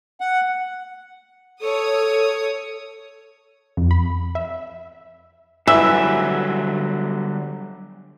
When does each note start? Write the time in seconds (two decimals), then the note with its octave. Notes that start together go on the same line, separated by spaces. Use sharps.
0.20 F#5
1.61 A4 C#5 D#6
3.77 F2
3.91 B5
4.35 E5
5.68 D3 E3 F#3 G3 E5